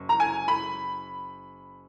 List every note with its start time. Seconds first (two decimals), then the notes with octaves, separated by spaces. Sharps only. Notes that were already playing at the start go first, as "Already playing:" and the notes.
Already playing: F#1
0.09 A#5
0.20 G#5
0.48 B5